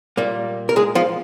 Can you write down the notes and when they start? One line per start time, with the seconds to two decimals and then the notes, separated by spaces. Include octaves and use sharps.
0.17 A#2 G3 A#3
0.69 A#4
0.76 G#3 G#4
0.95 F3 F4